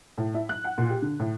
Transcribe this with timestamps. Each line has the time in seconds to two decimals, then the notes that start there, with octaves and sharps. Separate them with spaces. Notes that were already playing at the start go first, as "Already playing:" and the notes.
0.18 A2
0.34 E4
0.49 F#6
0.64 F#5
0.78 A#2
0.90 G4
1.02 D3
1.20 A2